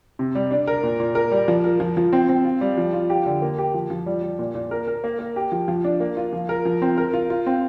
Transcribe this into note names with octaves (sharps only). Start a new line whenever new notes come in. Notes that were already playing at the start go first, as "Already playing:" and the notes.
C3
G3
D4
A#4
A#2
A#2
A#4
G3
F3
A#4
F3
F3
C4
C4
F4
G3
F3
F4
G4
D3
A#3
G4
F3
F3
G3
G3
A#2
A#2
A#4
A#4
A#3
A#3
G4
F3
F3
D4
A#3
F4
F3
A#4
F3
C4
A#4
F4
F4
C4